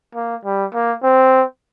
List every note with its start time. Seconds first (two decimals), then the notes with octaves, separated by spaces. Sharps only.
0.15 A#3
0.45 G3
0.74 A#3
1.03 C4